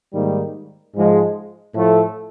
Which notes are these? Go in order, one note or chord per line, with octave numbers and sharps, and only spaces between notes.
G#2 D#3 G3 A#3 D#4
G#2 F3 G#3
A2 F3 A3